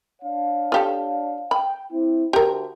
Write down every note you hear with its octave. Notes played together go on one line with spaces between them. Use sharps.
D4 C#5 F5
F4 G4 A4
G5 B5
C4 E4
D2 G4 A#4